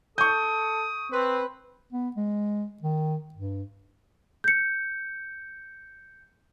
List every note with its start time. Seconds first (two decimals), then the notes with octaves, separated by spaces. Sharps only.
0.18 A4 C#6 D#6 G6
1.12 C4 B4
1.93 B3
2.16 G#3
2.82 D#3
3.34 G2
4.44 G6 C#7